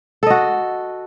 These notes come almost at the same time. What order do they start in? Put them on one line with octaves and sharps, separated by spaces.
A4 D#5 F#4